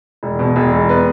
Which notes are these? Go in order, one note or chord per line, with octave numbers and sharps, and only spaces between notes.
E1
B2
E1
E1
B3